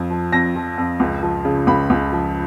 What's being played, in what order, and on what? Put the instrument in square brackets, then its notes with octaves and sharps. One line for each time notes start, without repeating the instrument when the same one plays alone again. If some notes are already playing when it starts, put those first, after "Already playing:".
Already playing: [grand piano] F2 F3
F3
F2 A#6
F3
F2
C#2
F3
C#3
C#2 B5
C#2
F3